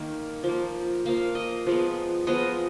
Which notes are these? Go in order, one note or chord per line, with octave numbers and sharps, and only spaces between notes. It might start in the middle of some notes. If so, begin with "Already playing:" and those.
Already playing: D#3 A#3
F3 A#3
F3 A#3 F5
D#5
F3 G#3 B3
F3 G#3 B3 D#5